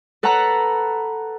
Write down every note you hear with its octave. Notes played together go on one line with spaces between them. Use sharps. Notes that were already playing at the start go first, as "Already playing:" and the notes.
A4 B4 F#5 A5 A#5 F#6